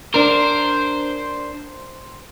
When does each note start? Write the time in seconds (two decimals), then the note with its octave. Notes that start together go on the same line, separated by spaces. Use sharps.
0.14 D4 A#4 C5